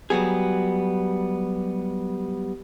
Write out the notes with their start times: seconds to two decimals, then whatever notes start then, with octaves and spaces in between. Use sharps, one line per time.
0.10 F#3 G3 B3 G#4